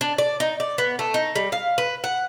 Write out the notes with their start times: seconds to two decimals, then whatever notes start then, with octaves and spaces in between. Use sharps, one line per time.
0.01 D4
0.18 D5
0.40 D#4
0.60 D5
0.78 B3
0.99 A3
1.14 D#4
1.36 G3
1.52 F5
1.78 B4
2.04 F#5